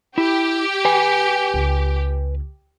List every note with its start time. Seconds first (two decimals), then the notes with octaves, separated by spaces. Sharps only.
0.18 E4 G4
0.85 B4 G#5
1.54 C#2